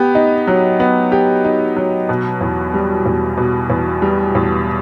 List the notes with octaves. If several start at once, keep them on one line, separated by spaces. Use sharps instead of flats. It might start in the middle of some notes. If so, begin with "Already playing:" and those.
Already playing: B3 G4
D#4
F#3
B3
G4
D#4
F#3
B2
E2
G3
E2
B2
E2
G3
E2